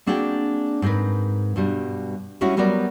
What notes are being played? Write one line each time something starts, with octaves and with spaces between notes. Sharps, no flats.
A#3 C4 D4 F#4 G#4 G5
G#2 C4 G4 A#4 B4
G2 B2 G3
G3 G#3 C#4 E4 F#4
F#3 G3 B3 F#4 A#4 D5